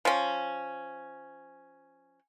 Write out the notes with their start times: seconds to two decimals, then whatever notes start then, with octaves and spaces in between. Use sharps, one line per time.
0.05 F3 C#4